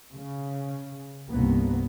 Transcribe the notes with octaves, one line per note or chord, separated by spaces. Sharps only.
C#3
C2 G2 A#3 B3